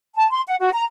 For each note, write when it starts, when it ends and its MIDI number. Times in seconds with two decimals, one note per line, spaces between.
0.16 0.30 81
0.30 0.41 84
0.48 0.56 78
0.60 0.69 66
0.73 0.85 82